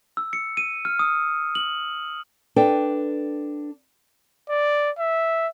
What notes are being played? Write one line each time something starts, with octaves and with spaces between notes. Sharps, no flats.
E6
C#7
D#7
F6
D#6
F#7
D4 A4 B4 G5
D5
E5